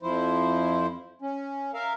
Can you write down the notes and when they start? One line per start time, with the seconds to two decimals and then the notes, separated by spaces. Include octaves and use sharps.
0.02 F2 F3 E4 C5
1.22 C#4
1.74 A#4 E5 F5